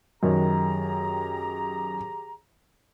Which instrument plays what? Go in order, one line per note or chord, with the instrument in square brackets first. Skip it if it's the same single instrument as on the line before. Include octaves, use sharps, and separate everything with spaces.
[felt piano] F#2 D#3 [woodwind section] G4 G#4 A#5